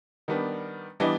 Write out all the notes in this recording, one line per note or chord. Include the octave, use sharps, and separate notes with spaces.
D#3 G3 B3 D4
E3 G3 B3 D4 D#5